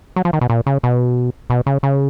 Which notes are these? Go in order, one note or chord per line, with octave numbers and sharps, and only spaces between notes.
F#3
F3
D#3
B2
A#2
C#3
B2
B2
C#3
C#3